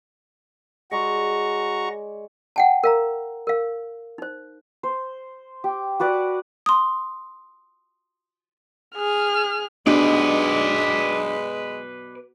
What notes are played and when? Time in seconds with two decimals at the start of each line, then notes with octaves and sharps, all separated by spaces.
0.92 G#3 F#4 C#5 D5 A#5 C#6
2.56 F#5 G5 A5
2.84 A#4 F5 A#5
3.47 A#4 F5
4.18 D#4 C5
4.83 C5
5.64 G4
6.00 F#4 B4 D5 F#5
6.66 C6 D#6
8.96 G#4 F6
9.87 B2 G#3 D4 G4 B4 D5